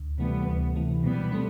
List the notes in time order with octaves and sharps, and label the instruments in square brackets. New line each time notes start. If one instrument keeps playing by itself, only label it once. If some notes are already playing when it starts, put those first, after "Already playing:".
Already playing: [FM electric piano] D2
[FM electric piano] C3 E3 A3 [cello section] G3 B3
[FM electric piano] D2
C3 E3 A3
[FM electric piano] B2 [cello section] G3 B3
[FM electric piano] A3 C4